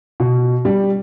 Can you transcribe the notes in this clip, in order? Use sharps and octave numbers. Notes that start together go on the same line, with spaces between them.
B2
G3